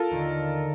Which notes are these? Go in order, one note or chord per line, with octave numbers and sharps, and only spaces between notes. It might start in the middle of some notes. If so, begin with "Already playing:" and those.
Already playing: F4 A4 A#4
D#2 D3